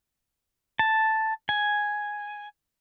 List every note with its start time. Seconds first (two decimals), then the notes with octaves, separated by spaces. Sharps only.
0.79 A5
1.49 G#5